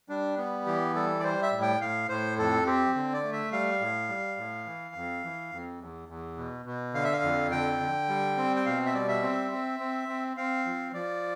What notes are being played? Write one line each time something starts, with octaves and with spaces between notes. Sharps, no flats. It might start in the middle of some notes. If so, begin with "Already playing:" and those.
G3 D4
B3
E3 G4
G3 A4
D5
G3 C5
E5
A2
G5
A2 F5
A2 C5
F2 A4
C4 G4
D3
D5
A3
E5
G3 F5
A2
G3
A2
E3
F2
E3
F2
E2
E2
B2
B2
D3 F5
E5
F5
F2
D3 G5
D3
G3
C4
G5
B2 F5
E5
G3 D5
E5
C4
C4
C4
C4
C4 F5
F3
F3 D5